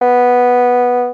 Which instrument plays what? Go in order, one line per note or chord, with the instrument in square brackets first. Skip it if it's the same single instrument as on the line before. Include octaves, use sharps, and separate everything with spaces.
[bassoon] B3